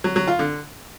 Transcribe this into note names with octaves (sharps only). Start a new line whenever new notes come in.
F#3
F#3
F4
D3